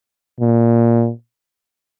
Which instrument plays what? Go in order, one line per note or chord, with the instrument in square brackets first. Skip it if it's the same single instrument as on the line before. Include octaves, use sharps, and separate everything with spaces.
[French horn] A#2